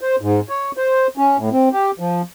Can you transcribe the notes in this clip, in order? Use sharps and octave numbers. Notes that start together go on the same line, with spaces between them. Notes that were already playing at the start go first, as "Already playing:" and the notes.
C5
G#2
C#5
C5
C#4
A2
C4
G4
F3